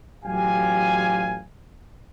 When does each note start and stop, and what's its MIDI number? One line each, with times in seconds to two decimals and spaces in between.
0.25 1.41 33
0.25 1.41 54
0.25 1.41 65
0.25 1.41 67
0.25 1.41 77
0.25 1.41 80